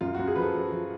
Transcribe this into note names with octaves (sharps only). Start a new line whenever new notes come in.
F#2 F4
F#2 F#4
G#4
F3 B4
A4
F3
F3